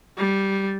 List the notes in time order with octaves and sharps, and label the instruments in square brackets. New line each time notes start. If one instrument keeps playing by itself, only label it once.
[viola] G3